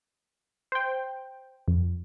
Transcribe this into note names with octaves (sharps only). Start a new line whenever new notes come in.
C5 G5
F2